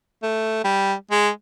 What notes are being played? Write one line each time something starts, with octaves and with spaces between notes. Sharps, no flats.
A3
G3
G#3